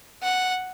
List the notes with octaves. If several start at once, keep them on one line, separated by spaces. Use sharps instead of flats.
F#5